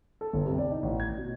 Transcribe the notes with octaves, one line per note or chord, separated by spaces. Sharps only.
A4
G1
C3
D5
D#4
A1
G#6
B2